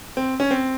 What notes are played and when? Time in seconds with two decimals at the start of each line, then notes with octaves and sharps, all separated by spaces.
0.17 C4
0.40 C#4
0.51 C4